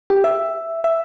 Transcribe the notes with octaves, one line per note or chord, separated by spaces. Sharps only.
G4
E5
E5